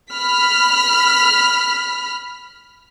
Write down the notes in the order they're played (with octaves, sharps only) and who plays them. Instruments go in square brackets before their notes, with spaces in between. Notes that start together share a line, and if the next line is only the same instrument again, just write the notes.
[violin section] B5 F6 B6